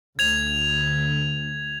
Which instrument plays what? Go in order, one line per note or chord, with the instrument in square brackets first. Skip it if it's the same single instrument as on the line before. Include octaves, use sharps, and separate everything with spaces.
[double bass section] D2 [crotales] G#6 F7